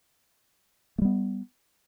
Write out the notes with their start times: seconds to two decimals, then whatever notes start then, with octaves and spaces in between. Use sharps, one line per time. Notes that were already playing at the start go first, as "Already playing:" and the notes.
0.98 A3
1.02 G3
1.05 B3